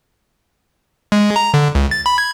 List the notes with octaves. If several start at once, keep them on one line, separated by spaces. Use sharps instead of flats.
G#3
A#5
D3
C#2
A6
B5
G#6